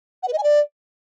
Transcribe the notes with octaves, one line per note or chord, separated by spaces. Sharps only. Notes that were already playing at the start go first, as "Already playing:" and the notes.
F#5
B4
D#5
G#5
D5